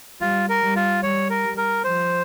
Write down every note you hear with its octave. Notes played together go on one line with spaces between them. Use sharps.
G3 F4
A#4
G3
F4
G3 C#5
A#4
G3
A#4
F3 C5